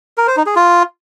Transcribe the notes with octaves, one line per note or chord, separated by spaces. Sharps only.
A#4
C5
D#4
G#4
F4